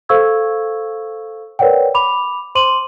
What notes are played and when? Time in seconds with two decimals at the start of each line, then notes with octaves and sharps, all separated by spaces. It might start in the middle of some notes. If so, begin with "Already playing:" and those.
0.09 A4 C5 F5 C#6 E6 G#6
1.59 A#4 B4 C#5 D5 F#5 G5
1.95 B5 D6 F7
2.55 C5 C6 D6 D#7 F#7